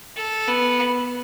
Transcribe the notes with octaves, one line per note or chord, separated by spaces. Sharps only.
A4
B3